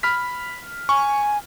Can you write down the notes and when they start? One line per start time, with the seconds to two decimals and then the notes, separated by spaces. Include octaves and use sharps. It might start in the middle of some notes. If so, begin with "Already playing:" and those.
0.03 B5 F6 B6
0.89 G#5 C#6